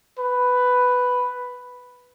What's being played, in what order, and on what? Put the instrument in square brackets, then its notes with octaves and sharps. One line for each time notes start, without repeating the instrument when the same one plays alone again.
[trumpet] B4